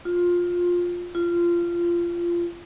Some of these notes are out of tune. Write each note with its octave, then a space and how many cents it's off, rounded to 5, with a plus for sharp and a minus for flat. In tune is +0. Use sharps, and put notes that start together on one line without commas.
F4 +15
F4 -20